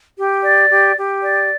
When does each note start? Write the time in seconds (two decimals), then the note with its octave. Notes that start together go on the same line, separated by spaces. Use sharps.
0.17 G4
0.43 D5
0.70 G4
0.96 G4
1.22 D5